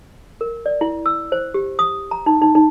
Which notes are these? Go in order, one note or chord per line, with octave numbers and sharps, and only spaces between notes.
A#4
D5
E4
E6
C5
G4
D#6
A#5
D#4
D#4
D#4